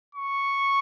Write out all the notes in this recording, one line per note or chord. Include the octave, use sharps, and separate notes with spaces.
C#6